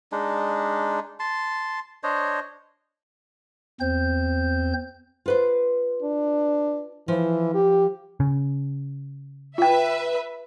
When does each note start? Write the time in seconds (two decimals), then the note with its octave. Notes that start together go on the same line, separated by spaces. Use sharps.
0.12 G#3 D4 D#4
1.20 A5 C6
2.03 D4 C5 C#5 D#5
3.81 E2 C4 C5 G6
5.26 F4 B4 C5
6.02 D4
7.08 E3 F3
7.54 G4
8.20 C#3
9.58 F4 B4 E5 G5